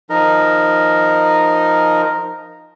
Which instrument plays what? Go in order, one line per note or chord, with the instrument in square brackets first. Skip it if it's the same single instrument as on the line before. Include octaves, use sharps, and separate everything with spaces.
[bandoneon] F3 D#4 A#4